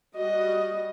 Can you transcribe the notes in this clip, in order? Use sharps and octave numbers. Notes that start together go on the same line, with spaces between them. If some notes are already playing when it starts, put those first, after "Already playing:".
G3 F#4 D#5